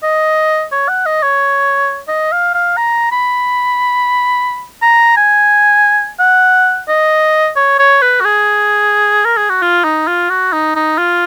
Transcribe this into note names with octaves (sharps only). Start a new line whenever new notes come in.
D#5
C#5
F#5
D#5
C#5
D#5
F5
F5
A#5
B5
A#5
G#5
F#5
D#5
C#5
C#5
B4
F#4
G#4
A#4
G#4
F#4
F4
D#4
F4
F#4
D#4
D#4
F4